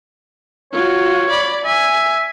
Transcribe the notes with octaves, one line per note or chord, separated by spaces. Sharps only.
F4 F#4 C#5
D5 B5
E5 G#5